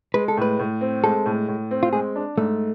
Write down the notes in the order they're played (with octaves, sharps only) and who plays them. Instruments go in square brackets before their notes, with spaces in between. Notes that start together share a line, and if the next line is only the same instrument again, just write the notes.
[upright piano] G#3 [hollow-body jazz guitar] B4
[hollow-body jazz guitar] A4
[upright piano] A2 [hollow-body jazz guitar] B4
[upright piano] A2
C4
[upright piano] G#3 [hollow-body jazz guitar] A4
[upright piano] A2
A2
C4
[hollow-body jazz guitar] F4
[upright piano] G#3 [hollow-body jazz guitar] G#4
[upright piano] D4
[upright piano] G#2 [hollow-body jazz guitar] A3